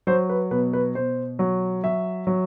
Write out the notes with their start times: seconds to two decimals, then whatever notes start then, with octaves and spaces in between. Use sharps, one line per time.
0.07 F#3 C5
0.29 B4
0.51 B2 B4
0.73 B4
0.95 B2 C5
1.39 F#3
1.84 F#3 E5
2.27 F#3